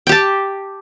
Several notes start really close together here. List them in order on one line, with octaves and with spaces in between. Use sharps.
G5 G4 A5